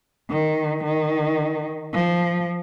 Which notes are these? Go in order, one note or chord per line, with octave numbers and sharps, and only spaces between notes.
D#3
D#3
F3